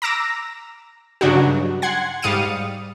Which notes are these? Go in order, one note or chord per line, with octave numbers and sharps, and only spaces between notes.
A#5 D6 E6 A#6
G2 C#3 F#3 D4 D#4 F#4
F#5 C6 G#6
G#2 G3 F5 D#6 C#7 D#7